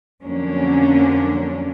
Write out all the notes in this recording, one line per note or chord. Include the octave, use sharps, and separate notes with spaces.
F2 D3 F#3 A#3 C#4 D4